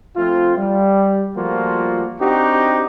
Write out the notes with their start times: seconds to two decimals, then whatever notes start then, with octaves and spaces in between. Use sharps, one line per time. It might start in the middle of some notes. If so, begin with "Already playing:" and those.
0.17 F3 A3 C4 F4
0.57 G3
1.37 F3 G3 A3 A#3 F4 F#4
2.19 C4 D4 D#4 F#4 G4